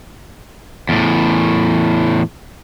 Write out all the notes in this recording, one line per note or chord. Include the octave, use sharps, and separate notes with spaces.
E2 A2